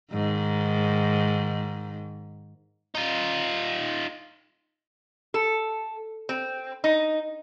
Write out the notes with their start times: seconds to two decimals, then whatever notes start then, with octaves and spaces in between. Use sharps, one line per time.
0.12 G#2 D#3
2.95 D#4 F4
5.34 A4
6.29 C4
6.84 D#4